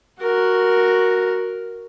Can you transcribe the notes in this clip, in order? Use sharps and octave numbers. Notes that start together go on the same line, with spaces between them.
F#4 A#4